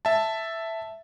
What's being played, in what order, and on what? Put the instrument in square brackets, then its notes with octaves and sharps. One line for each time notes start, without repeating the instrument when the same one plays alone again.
[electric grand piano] E5 A5